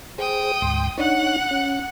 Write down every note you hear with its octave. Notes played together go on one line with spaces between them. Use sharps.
G#4 C5 G5 D#6
D2 G#2 C6
D4 D#4 C#5 F#5 F#6
C#4